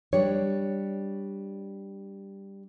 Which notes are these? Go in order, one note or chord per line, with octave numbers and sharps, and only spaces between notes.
G3 D4 C#5